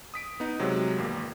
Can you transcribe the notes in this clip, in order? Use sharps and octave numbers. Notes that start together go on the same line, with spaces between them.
D#6 B6 D7
B3 D#4
C3 F#3 G#3
G#1 E2 A#3